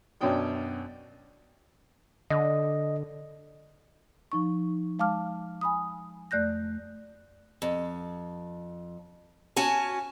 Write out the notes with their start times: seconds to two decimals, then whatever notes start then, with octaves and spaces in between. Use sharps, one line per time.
0.21 F#2 B2 C#4 D4 G5 D#6
2.31 D3 D#5
4.32 F3 D#4 C#6
4.99 G#3 F5 A5 D6 F6
5.61 G#5 B5 D#6
6.31 F2 A3 D5 F#6 G6 A#6
7.62 F2
9.56 C#4 F#4 G#5 A5